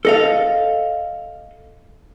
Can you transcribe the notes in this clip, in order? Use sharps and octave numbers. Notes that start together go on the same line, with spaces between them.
A4 D#5 F5